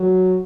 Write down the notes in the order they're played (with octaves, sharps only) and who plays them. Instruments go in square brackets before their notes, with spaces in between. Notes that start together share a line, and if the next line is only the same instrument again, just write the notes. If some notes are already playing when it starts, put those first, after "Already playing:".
Already playing: [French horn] F#3